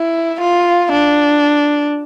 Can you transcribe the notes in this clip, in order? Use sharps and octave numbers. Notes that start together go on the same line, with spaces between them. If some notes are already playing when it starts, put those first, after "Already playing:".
Already playing: E4
F4
D4